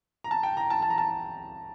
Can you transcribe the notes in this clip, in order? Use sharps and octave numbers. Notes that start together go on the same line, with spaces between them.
A#5
A5
G5
A#5
A5
A5
A#5
A5